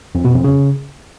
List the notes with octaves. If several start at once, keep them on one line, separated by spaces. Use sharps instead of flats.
F2
B2
F2
C#3